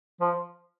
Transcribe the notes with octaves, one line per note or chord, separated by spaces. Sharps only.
F3